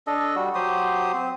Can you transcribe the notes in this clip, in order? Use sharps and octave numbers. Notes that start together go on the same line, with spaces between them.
D4 A4 D#5
G3 F#4
F#3 G4 C5 D#6
C4